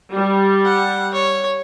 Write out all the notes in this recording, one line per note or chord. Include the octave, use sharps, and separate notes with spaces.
G3
F#5
C#5